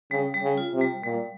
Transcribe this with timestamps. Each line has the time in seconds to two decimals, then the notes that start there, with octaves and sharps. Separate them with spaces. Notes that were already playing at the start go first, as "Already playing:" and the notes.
0.11 C#3 G3
0.34 G3
0.43 C#3
0.58 F4
0.73 C3
0.81 G3
1.03 A#2 G3